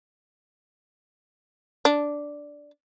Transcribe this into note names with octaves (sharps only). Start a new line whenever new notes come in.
D4